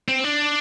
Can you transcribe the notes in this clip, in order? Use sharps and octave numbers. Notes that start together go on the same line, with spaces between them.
C4
D4